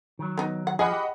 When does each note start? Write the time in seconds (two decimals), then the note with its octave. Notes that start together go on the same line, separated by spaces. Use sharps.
0.19 D#3 F#3
0.38 B3 D#4
0.67 F#5
0.79 F3 G#4 D#5 F#5 B5
0.92 G4